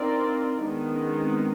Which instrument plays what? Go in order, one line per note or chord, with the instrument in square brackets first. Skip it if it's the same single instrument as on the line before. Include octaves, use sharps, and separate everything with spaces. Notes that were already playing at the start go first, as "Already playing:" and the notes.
Already playing: [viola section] C4 F4 A#4 D5 [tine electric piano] D4 D#4
[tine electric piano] D#4
[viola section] D#3 G#3 B3 [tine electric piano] D4
[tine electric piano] C#4
C4